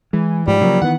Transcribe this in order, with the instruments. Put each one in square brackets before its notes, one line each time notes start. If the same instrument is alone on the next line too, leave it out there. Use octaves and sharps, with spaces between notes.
[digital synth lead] E3 [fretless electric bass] G#3
[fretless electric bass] G#2 F3 [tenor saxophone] G3
[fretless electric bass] C#3 F3 A#3 [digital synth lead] F#3
[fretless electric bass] D#3 E3 B3 [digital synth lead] F#5